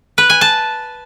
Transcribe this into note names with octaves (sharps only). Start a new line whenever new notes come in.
B4
G#5
A5